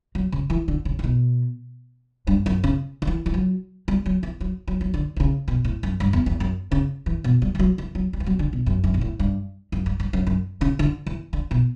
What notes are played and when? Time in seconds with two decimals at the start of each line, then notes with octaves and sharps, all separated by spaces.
0.15 F#3
0.32 C#3
0.50 E3
0.68 D3
0.85 C#3
0.99 C#3
1.04 B2
2.27 G2
2.46 F#2
2.64 C#3
3.02 D3
3.07 E3
3.26 E3
3.34 F#3
3.88 G3
4.06 F#3
4.23 E3
4.40 F#3
4.68 F#3
4.81 F#3
4.94 D3
5.17 D3
5.20 C#3
5.48 B2
5.65 A2
5.83 F#2
6.00 G2
6.13 E2
6.26 E2
6.40 F#2
6.72 C#3
7.06 E3
7.24 B2
7.42 G3
7.55 E3
7.59 F#3
7.78 E3
7.95 F#3
8.13 G3
8.20 E3
8.26 F#3
8.39 D3
8.53 B2
8.66 F#2
8.84 F#2
8.94 B2
9.01 A2
9.19 G2
9.72 F#2
9.86 G2
10.00 G2
10.13 F#2
10.27 F#2
10.61 C#3
10.79 D3
11.07 E3
11.33 D3
11.51 B2